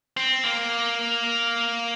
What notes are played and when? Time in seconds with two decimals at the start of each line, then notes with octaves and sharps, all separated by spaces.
0.17 C4
0.44 A#3